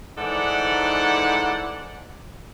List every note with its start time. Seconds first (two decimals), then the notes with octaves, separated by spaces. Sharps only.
0.18 G#2 E3 D#4 A4 D5 F#5